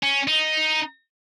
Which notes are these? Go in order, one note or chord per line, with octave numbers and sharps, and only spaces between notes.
C#4
D#4